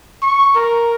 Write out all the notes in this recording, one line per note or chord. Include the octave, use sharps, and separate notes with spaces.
C#6
A#4